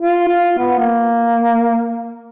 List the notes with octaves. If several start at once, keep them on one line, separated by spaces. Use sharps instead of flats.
F4
F4
B3
A#3